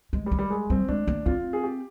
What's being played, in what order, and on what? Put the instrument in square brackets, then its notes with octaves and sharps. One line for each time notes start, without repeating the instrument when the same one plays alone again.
[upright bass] G#3
[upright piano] G3
[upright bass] G#3
[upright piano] G3
G#3
[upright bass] G3 [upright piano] C4
[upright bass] G#3 [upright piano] D4
[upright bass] A#3
[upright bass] C4 [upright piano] F4
[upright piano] G#4
G4